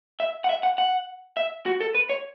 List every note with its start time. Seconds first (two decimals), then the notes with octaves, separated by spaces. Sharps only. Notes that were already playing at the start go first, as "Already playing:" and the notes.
0.20 E5
0.44 F#5
0.49 E5
0.63 F#5
0.78 F#5
1.37 E5
1.66 F#4
1.80 A4
1.95 B4
2.09 C#5